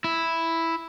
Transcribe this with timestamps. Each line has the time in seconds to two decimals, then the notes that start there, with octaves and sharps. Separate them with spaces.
0.04 E4